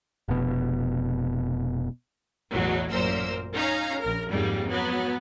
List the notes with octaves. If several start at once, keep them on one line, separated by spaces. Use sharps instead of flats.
F1 B2
A1 E2 B2 F#3
A1 F#2 A#2 A#4 C5 E6
C#4 D#4 F5 A#5
A#1 A#4
F2 G#2 C#3 G3 A#3
F#3 B3